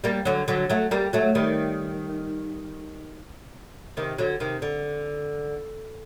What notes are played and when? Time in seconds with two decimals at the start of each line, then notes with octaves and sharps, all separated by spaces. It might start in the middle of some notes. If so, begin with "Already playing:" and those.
0.04 G3 A#3
0.25 D3 F#3
0.48 D3 F#3
0.70 F#3 A3
0.91 G3 A#3
1.13 F#3 A3
1.35 D#3 G3
3.97 C3 D#3
4.18 D3 F#3
4.40 C3 D#3
4.62 D3